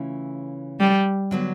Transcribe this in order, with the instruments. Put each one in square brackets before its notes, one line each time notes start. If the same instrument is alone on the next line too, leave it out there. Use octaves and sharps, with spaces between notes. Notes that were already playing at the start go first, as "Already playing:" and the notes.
Already playing: [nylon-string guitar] C#3 E3 A3 C#4 F4
[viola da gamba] G3
[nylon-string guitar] D3 F#3 B3